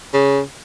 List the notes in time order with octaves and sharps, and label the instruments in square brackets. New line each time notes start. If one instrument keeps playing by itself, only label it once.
[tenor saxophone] C#3